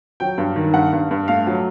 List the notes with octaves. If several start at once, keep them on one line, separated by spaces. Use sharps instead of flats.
F#3 G5
G2
D#3
G2 F#5
G2
G2
A3 F5
F#3